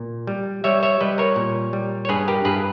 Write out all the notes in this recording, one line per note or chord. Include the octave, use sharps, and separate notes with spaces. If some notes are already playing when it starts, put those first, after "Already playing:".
Already playing: A#2
G3
G3 C#5 E5
C#5 E5
G3 B4 D#5
A#4 C#5
A#2
G3
C#5
G2 G#4 B4
G4 A#4
G2 G#4 B4